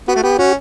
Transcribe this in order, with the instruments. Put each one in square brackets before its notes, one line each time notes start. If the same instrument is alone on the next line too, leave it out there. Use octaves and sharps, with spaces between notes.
[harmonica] B3 [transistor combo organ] F#4
[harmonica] A3
[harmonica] B3 [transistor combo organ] G4
[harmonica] C#4 [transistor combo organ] F#4